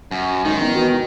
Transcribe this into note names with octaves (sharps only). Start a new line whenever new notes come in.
F#2
G#2 D#3
E2
B2